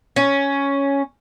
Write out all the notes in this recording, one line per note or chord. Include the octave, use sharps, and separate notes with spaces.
C#4